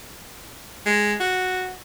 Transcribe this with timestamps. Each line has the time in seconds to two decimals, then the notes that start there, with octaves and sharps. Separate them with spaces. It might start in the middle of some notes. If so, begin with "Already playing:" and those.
0.86 G#3
1.20 F#4